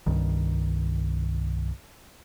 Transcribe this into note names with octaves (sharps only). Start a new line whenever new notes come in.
C2 G2 D#3